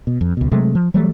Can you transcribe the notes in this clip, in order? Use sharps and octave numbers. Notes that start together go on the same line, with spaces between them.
B2
F2
C#2 B2
C3 F#3 G#3 A3
F3
E3 F#3 G3 A3